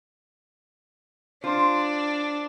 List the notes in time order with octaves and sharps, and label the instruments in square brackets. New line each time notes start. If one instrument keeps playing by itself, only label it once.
[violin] D4 [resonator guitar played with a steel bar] F4 C5